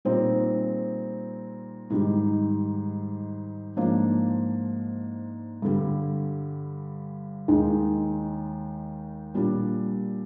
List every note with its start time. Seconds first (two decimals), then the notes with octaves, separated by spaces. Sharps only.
0.05 A#2 G3 C4 D#4
1.90 G#2 D#3 G3
3.77 G#2 F3 A#3 D4
5.62 G2 D3 G3
7.48 D#2 D#3 G#3
9.34 A#2 G3 D4